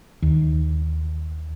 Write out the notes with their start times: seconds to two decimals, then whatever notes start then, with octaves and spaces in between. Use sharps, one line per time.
0.22 D#2